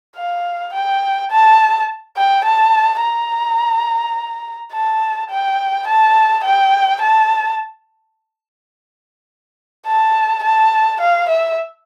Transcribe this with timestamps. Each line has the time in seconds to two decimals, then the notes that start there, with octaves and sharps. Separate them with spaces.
0.16 F5
0.73 G5
1.31 A5
2.17 G5
2.44 A5
3.02 A#5
4.73 A5
5.30 G5
5.87 A5
6.44 G5
7.01 A5
9.87 A5
10.43 A5
11.00 F5
11.29 E5